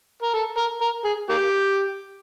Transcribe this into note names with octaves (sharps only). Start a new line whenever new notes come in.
A#4
A4
A#4
A#4
G#4
A#3 G4